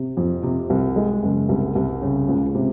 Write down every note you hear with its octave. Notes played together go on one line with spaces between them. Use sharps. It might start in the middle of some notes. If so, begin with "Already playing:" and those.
Already playing: C3
F2
C3
C2
G#3
F#1
C2
C2
C#3
C#2
C3